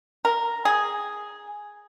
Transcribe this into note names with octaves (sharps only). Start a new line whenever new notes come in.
A#4
G#4